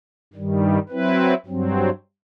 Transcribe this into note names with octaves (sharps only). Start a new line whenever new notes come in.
G2 D#3 G3
F#3 C4 E4 B4
G2 F#3 C4